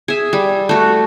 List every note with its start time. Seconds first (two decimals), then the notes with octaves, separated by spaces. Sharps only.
0.08 G#4 E5
0.33 G3
0.69 A3 F#4